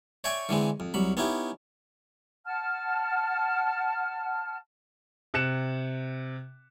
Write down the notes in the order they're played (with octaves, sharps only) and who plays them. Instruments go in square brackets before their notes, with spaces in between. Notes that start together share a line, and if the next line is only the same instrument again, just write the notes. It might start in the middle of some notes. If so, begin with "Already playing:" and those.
[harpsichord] C#5 D5 E5 G5 G#5 C#6
D3 E3 G#3 C4
F2
C2 F#3 B5
B3 C#4 D#4 E4 G4
[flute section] F#5 A5 F6
[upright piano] C3 F#6 C#7 E7